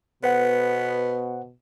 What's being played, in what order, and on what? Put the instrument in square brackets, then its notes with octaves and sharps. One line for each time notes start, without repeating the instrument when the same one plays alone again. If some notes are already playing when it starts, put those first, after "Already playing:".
[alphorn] B2 [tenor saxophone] B3 [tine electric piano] C5 F#5